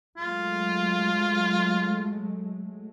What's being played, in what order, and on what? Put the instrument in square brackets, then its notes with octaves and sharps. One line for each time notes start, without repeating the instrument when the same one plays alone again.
[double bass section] F#3 G#3 A3 [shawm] F4